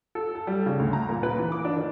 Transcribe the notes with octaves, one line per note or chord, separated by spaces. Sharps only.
A4
A4
G3
C#3
D2
A#5
A#2
B4
E3
D6
D4
D#3